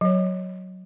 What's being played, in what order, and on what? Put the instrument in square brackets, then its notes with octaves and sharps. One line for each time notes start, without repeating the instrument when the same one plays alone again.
[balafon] F#3 C#5